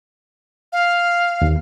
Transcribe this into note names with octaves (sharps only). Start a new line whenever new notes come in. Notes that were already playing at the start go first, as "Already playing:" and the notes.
F5
D#2